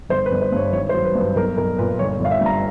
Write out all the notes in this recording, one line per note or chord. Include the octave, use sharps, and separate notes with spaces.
G1 C5
B4
G1
C5
G2 C#5
G#1 C#5
C5
F#3
B4
G2 B4
B1 A#4
B1 A#4
A#2 B4
G1 C#5
G1
F5
E5
G2 A#5